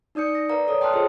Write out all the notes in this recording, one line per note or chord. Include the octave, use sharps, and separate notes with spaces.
D#4 D5 D#6 G6 C#7
A#6
A#4 B4 D5 F5 A#5
A4 C#5 D#6
G5 A5 C6 D#6 F6 F#6
F4 G#4 A4 C5 C#5 D#5